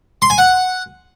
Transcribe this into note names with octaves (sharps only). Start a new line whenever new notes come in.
C6
G#5
F#5